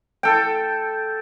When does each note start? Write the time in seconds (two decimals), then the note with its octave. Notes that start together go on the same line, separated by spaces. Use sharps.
0.23 A4 G5